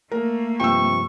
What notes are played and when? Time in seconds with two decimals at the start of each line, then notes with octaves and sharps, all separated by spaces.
0.11 A3 A#3 A#4
0.60 G2 C3 F3 G5 C#6 E6